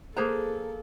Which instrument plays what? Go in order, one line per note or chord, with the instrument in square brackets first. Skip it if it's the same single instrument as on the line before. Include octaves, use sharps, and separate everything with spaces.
[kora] A#3 G#4 B4 [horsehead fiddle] A4 [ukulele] C5 A#5